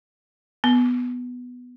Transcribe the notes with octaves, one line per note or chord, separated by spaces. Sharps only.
B3